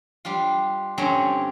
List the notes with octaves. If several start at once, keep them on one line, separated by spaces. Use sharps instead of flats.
G3 D4 F4
G2 D3 C4 C#4 A#5